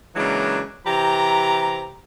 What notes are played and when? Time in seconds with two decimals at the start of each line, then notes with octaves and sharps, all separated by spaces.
0.16 C#3 E3 F#3 G#3 A#3 D4
0.86 C3 E3 G4 A#5